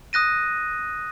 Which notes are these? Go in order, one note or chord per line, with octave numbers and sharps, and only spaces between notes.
D#6 F#6 A#6 D#7